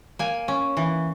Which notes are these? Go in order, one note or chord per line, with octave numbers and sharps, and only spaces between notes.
A#3 G#5
C#4
E3